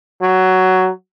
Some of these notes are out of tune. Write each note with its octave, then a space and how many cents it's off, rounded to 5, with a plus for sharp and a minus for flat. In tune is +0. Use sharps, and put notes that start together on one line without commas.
F#3 +10